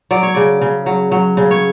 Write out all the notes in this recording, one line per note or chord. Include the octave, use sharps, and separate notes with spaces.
F#3 D5
C#5
C#3 D5
C#3
F#3
F#3
C#3
C#5